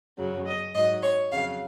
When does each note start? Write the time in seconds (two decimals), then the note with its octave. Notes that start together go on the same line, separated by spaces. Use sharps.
0.18 F#2 C#3 F#3
0.46 D#5
0.74 G#2 F#3 D#5
1.02 C#5
1.31 F2 C#3 F#3 F5